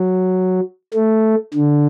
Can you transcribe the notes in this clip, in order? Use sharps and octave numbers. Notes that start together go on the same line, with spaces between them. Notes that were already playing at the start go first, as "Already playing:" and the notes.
Already playing: F#3
A3
D3